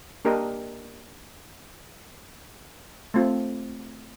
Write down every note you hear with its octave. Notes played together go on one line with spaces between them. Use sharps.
A#3 D4 G4 A#4 D#5
A3 C4 F4